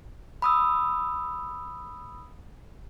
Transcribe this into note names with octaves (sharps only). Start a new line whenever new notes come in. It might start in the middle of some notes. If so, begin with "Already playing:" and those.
B5 D#6 E6